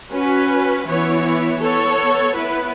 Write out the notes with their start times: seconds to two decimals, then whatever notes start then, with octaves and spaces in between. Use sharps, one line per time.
0.12 C#4 F#4 B4
0.86 E3 B3 E4 C#5
1.61 B3 A4 C#5
2.36 B3 E4 B4